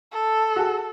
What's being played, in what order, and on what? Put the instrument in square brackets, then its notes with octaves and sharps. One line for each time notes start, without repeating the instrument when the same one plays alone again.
[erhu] A4
[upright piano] F#4 G#4